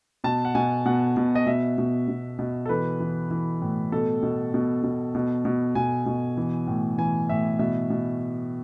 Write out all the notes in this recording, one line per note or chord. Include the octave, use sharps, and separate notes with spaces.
B2 A5
F#5
B2 G#5
B2 F#5
B2
D#5
B2 E5
B2
B2
B2
A4
E3 B4
E3
E3
A2
B2 A4
B2
B2
B2
B2
B2
B2 G#5
B2
E3
A2
E3 G#5
A2 E5
B2 E5
B2